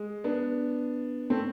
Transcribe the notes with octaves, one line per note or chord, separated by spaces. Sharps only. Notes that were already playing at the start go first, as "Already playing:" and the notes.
Already playing: G#3
B3 D4
A3 C4